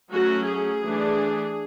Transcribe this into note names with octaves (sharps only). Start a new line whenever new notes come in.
F#3 A3 C#4 F#4
G#4
E3 A3 D4